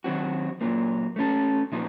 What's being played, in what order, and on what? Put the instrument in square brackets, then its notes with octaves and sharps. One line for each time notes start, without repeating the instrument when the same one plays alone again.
[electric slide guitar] D#3 F#3 C4 F#4
A#2 F#3 A#3
A3 C#4 A4
A#2 F3 A#3 D#4